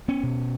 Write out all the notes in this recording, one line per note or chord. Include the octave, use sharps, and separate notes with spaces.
B3 C#4
B2